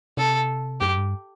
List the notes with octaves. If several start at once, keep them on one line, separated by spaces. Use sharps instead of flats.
C3 A4
F#2 G4
G2